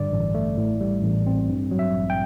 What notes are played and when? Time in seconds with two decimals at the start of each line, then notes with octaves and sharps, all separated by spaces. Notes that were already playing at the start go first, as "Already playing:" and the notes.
Already playing: G2 D3 D5
0.12 A1
0.35 A3
0.57 A2
0.81 G3
1.03 A1
1.27 C4
1.49 G2
1.71 F#3
1.79 E5
1.94 A1
2.10 G5